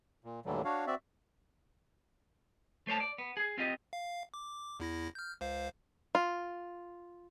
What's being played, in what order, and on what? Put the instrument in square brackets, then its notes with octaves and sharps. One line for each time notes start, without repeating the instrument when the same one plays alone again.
[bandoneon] A#2
D#2 A2 D3 E3 F#3 G3
D4 F#4 C#5 F5
C4 F#4 D5 E5
[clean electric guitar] A3 C5 C#5 A5
D5
B3
G#4
C4 F4 G4 D#5
[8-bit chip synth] F5
D6
E2 E4 A#6
F6 G6
C#2 C5 F5
[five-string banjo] F4